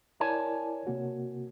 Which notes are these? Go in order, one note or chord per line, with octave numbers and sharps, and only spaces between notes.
E4 A#4 C#5 D5 G#5 A5
C3 A#3 F#4